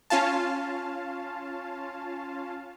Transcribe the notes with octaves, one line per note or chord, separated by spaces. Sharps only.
C#4 F4 F5 A5